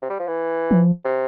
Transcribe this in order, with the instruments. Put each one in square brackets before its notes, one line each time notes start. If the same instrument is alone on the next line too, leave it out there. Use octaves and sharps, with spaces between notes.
[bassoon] C3
G3
F3
E3
[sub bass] F3
[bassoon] C3